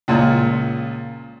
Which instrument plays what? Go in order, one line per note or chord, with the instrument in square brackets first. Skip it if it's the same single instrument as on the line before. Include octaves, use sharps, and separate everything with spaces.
[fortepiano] C#2 A#2